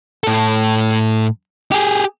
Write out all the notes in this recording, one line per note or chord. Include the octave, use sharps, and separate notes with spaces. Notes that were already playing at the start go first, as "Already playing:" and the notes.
A2 A4
G4 G#4